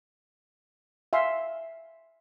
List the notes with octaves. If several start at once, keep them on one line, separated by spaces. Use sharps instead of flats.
E5 F5 G#5 C6